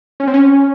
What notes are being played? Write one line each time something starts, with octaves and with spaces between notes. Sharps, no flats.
C#4
C4
C#4